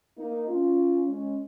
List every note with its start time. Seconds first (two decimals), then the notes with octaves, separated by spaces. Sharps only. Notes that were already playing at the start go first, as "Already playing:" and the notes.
0.18 A#3 D#4
0.48 C#4 F4
1.07 G#3 C#4